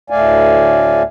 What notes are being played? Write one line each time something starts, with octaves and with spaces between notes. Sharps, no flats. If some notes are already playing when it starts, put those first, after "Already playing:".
D2 A2 A3 D5 F5 G#5